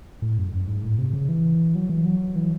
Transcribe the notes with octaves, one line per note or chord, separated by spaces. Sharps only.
A2
F#2
F#2
G#2
A2
C3
C#3
E3
F#3
E3
F#3
E3